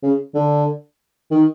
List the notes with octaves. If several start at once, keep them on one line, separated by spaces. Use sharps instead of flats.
C#3
D3
D#3